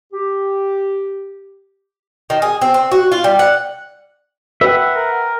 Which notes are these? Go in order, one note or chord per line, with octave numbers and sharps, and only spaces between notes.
G4
D#3
G#4
C4
C4
F#4
F4
G3
F#5
B4 E5 F#5 G5
A#4